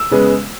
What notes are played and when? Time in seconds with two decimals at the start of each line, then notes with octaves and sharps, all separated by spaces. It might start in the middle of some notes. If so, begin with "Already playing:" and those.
Already playing: E6
0.11 C#3 G#3 B3